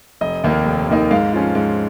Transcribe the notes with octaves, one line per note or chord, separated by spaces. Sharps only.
F1 D#5
D#2 D#3 A#3 D#4
F1
D#2 D#3 A#3 D#4
G#2 F5
F3 C#4 F4
G#2